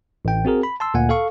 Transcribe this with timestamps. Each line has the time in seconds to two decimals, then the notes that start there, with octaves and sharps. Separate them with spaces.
0.25 A1 G5
0.45 C4 F#4 G#4 A#4
0.63 B5
0.80 A5 C6 E6
0.94 D2 A#2 A#3 F#5 G#5
1.09 A4 F5 C#6